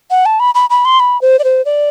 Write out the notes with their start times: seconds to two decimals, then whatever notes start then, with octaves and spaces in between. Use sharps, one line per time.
0.11 F#5
0.26 A5
0.40 B5
0.55 B5
0.70 B5
0.85 C6
1.00 B5
1.22 C5
1.39 D5
1.44 C5
1.65 D5